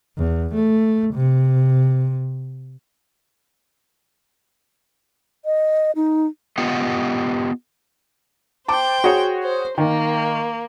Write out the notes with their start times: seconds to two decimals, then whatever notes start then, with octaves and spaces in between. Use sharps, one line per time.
0.18 E2
0.55 A3
1.14 C3
5.45 D#5
5.96 D#4
6.58 B3 F4 G4 D#5 F#5
8.68 C5 G5 A5 D6
9.04 F#4 G#4 C#5
9.43 C5
9.78 D#3 A#3